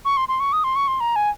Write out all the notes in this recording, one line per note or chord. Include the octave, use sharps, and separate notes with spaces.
C#6
C6
C6
C#6
D#6
C6
C#6
C6
A#5
G#5